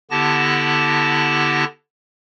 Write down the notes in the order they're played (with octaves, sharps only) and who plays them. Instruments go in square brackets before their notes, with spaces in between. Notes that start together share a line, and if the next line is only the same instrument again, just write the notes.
[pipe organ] D3 B3 E4 G4 A5 A#6